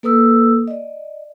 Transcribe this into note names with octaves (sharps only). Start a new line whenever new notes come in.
A#3 A4 B4 D#6 E6
D5 D#5